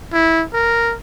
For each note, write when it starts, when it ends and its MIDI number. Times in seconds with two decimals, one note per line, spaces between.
0.13 0.44 64
0.53 0.95 70